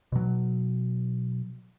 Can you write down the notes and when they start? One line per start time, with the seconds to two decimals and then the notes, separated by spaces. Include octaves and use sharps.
0.12 B2 F#3